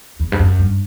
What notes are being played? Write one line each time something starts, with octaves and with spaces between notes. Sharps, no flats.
E2
G2
F#2
G2